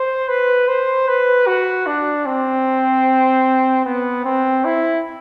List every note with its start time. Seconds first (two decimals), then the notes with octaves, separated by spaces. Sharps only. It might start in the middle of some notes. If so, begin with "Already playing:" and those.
Already playing: C5
0.28 B4
0.68 C5
1.08 B4
1.47 F#4
1.87 D4
2.26 C4
3.85 B3
4.25 C4
4.65 E4